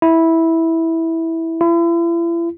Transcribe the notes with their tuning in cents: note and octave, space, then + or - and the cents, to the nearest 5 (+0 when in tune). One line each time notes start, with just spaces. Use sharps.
E4 -10
E4 +40